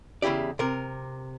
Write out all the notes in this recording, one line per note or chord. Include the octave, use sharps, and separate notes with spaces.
E2 C#3 E4 G4 D5
C3 A#4